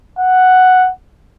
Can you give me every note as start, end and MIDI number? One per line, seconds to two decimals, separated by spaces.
0.19 0.90 78